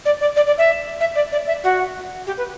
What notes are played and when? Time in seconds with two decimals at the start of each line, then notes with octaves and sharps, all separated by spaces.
0.05 D5
0.21 D5
0.36 D5
0.47 D5
0.58 E5
1.00 E5
1.15 D5
1.32 D5
1.47 E5
1.64 F#4
2.27 G4
2.37 B4